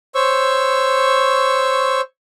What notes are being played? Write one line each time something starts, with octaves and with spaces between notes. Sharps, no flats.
C5 C#5 C#6 E6